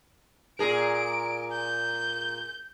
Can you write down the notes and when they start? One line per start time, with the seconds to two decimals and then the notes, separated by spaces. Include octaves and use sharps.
0.59 A#2 G#4 A#4 D7
1.52 G6